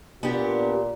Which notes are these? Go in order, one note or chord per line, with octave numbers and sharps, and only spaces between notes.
A#2 B3 D4 G4